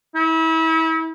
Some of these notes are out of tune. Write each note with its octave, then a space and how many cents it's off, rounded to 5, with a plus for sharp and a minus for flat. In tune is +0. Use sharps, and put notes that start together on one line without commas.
E4 -35